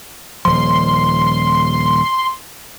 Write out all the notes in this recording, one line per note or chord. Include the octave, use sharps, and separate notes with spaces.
D#1 F3 C6